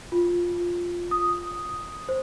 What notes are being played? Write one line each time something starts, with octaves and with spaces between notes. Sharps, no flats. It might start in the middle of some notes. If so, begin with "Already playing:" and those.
F4
D#6
C5